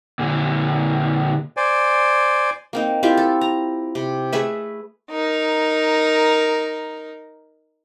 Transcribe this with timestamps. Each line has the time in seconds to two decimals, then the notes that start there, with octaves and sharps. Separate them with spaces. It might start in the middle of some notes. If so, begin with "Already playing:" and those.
0.19 A#2 D3
1.57 C5 D5 G#5
2.73 A#3 C4 D#4
3.03 C4 E4 F4 G4
3.17 A4
3.41 A#5
3.95 C3
4.33 A3 G#4 B4 E5
5.11 D#4 A#4